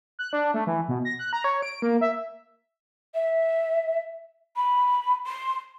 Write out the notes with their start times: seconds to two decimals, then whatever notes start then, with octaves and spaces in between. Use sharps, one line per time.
0.19 F#6
0.33 D4
0.54 A3
0.67 E3
0.88 B2
1.05 A#6
1.19 F#6
1.33 A#5
1.44 C#5
1.62 D7
1.82 A#3
2.01 E5
3.14 E5
4.56 B5
5.26 C6